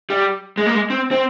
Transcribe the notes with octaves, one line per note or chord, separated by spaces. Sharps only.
G3
G#3
A#3
G#3
C4
C4